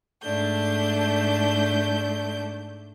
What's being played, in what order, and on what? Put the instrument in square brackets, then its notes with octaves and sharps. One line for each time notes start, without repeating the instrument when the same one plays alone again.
[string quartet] G#2 A3 D4 G6